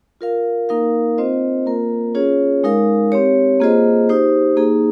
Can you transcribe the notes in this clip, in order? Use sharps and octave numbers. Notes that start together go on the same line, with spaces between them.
F4 A#4 F5
A#3 D#4 A#4 F5
C4 F4 C5 D#5
A#3 F4 A#4
C#4 F4 G#4 C#5
G#3 D#4 A#4 F5
C4 G4 C#5
A#3 F4 G#4 C5 D#5
D#4 G4 C5
A#3 D#4 G#4